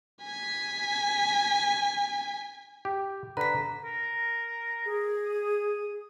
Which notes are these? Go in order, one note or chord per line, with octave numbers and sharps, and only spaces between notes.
G#5 B6
G4
D3 B4 A#5 B6
A#4
G#4
D#6